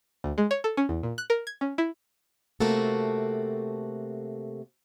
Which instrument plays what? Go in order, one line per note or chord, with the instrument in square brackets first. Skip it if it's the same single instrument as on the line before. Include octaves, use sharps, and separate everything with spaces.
[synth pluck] D2
G#3
C#5
A4
C#4
E2
A#2
F#6
A#4
G#6
C#4
E4
[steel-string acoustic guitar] C3 A3 A#3 F#4 A4